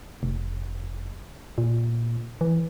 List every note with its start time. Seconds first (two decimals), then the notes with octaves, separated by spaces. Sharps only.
0.23 F1
1.58 A#2
2.41 E3